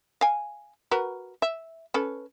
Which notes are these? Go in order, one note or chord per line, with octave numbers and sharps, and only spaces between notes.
F5 G#5
F#4 A#4 B4
E5
C#4 A4 B4